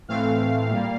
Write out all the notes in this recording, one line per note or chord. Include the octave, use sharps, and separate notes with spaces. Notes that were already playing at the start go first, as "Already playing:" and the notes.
A2 E3 A3 C4 F5
A#2 G3 A#3